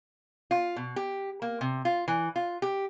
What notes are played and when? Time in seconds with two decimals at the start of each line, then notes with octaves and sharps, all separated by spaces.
0.51 F4
0.76 B2
0.96 G4
1.42 A#3
1.61 C3
1.85 F4
2.08 E3
2.36 F4
2.62 G4